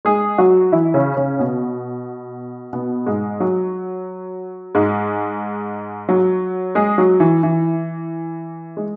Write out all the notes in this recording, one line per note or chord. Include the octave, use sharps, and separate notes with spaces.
G#3 G#4
F#3 F#4
E3 E4
C#3 C#4
C#3 C#4
B2 B3
B2 B3
G#2 G#3
F#3
G#2 G#3
F#3
G#3 G#4
F#3
E3
E3
G#3